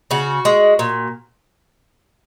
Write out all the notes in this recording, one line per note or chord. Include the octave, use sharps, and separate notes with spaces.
C#3 F#4
G#3
A#2